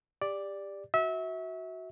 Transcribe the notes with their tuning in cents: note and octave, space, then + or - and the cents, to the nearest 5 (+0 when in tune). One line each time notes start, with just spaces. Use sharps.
G4 +25 D5 +0
F#4 +0 E5 -30